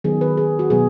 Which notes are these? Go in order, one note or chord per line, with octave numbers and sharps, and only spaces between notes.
D#3 F#3 B3 G#4
B4
G#4
F#4
B2 F#3 B3 G#4